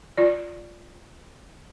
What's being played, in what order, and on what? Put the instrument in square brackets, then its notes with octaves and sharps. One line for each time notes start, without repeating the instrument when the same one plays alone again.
[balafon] F4 D5